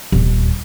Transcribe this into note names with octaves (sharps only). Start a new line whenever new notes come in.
D#1